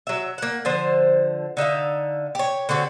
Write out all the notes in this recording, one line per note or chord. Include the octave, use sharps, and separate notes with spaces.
F#3 E5
A#3 F#5
D3 F3 C5
D3 D#4 E5 F5
G4 C#5
D3 C4 F#4 G4